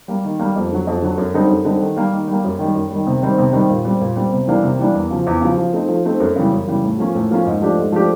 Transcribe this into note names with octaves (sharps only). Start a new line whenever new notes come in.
G3 A#3
D#3
G3 A#3
F2
D3 F#3
F2
D3 F#3
F#2
D3 G3 C4 D#4
F#2
D3 G3 C4 D#4
D#3
G3 A#3
D#3
G3 A#3
F#2
D#3 G3
F#2
D#3 G3
C3
D#3 G3 C4
C3
D#3 G3 C4
A#2
G3 C4
A#2
G3 C4
C3
E3 G3 A#3 D4
C3
E3 G3 A#3 D4
E2
C#3 F3
E2
C#3 F3
F3
A3 C4 D#4
F3
A3 C4 D#4
F#2
C#3 E3 G3
F#2
C#3 E3 G3
A2
F3 A#3 C#4 F4
A2
F3 A#3 C#4 F4
G#2
F3 A3 D4 G4
G#2
F3 A3 D4 G4